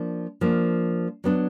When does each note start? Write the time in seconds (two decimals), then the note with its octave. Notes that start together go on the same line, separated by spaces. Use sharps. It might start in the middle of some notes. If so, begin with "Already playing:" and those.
Already playing: F3 A#3 D4
0.41 F3 A#3 D4
1.24 F#3 B3 D4